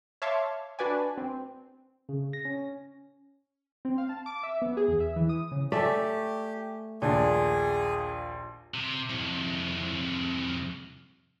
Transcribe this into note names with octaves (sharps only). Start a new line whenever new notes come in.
C#5 E5 F5 A5 C6 D6
D4 F#4 B4 D5 G#5
C4
C#3
A#6
C#4
C4
F5
A5
D6
E5
B3
G#4
E2
E5
E3
D#6
C#3
A3 G4 D5 E5 G#5
A#1 D#2 A#2 D4 G#4 G#5
C3
C2 F2